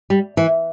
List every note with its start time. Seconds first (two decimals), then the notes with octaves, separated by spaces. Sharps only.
0.10 G3
0.37 E3